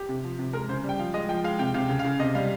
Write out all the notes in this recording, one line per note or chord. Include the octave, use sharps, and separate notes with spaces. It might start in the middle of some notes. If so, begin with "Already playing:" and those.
Already playing: G4
C3
F3
C3
G#3 A#4
C#3 C5
G3
G5
F3 F5
G#3 D#5
F3 G5
G#3 F5
C3 G5
C3 F5
C#3
F5
C#3
C3 D#5
G3 F5